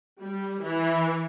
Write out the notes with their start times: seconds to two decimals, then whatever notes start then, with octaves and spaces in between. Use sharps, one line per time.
0.21 G3
0.63 E3